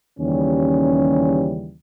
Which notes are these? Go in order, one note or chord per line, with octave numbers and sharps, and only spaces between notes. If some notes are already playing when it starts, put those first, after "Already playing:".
D#2 C#3 E3 G3 C#4